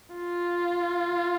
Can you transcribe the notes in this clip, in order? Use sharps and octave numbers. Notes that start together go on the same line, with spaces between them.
F4